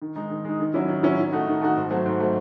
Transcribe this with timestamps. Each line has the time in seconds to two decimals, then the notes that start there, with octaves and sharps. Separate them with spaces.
0.02 D#3
0.16 G#3 D#4
0.30 D#3
0.45 G#3 D#4
0.60 D#3
0.74 F#3 C#4 E4
0.88 D#3
1.03 F#3 C#4 E4
1.18 D#3
1.32 A3 D#4 F#4
1.48 D#3
1.61 A3 D#4 F#4
1.77 G#2
1.90 F#3 A3 C4
2.06 G#2
2.20 F#3 A3 C4